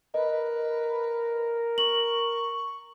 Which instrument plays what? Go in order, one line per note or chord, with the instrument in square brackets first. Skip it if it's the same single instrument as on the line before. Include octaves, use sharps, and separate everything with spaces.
[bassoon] A#4 [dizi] B4 [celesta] D#5
[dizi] C#6 [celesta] F#7